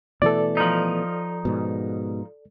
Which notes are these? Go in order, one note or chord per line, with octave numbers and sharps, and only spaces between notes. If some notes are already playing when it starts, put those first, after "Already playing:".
B2 E3 A3 A4 D5
F3 D#4
G#2 B2